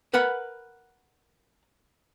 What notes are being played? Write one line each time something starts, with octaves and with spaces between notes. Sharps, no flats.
A#4 B4 F#5 B5